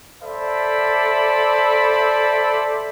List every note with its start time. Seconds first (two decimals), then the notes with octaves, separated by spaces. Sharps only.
0.23 A4 C5 D5 E5 B5